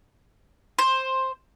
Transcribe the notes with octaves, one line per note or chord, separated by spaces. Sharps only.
C5